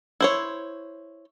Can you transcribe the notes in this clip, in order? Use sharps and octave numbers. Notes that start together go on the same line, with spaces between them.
E4 C5 C#5